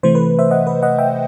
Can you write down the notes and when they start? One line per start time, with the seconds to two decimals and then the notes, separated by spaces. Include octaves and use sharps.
0.03 C3 E3 A3 C5
0.15 B4
0.39 C5 E5
0.51 D#5 F#5
0.67 B4 D#5
0.83 D#5 F#5
0.98 E5 G5